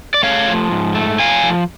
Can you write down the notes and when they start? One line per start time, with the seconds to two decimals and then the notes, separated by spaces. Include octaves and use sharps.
0.14 D5
0.23 A3 C#5 F5
0.48 F3
0.71 G#2
0.95 A3
1.19 F3 F5 G#5
1.43 F3